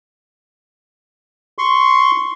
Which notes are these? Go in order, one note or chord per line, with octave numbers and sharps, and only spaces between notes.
C6 C#6